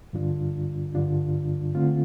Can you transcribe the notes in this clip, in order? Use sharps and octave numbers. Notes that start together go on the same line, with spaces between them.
G2 D3 G3 D4 F4
G2 D3 G3 D4 F4
D3 A3 C4 F4